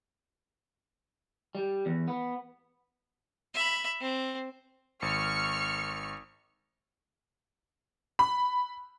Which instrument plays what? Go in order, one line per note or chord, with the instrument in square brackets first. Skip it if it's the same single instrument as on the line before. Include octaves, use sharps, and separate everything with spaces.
[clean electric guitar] G3
E2
B3
[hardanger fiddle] E5 B5
C4
[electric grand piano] G#1 [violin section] C#6 F6 C#7
[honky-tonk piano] B5